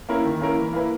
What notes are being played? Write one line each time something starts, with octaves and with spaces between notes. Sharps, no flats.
A#3 C#4 E4 A#4
D#3
A#3 C#4 E4 A#4
E3
A#3 E4 B4